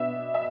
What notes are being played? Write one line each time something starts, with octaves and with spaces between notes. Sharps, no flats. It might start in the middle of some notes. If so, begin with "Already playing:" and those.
Already playing: B2 B3 D4 E5
E5